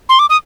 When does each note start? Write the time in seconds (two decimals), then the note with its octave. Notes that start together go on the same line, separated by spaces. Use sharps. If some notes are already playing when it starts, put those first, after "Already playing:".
0.09 C6
0.19 D6
0.30 D#6